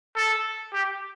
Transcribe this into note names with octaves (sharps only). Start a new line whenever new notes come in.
A4
G4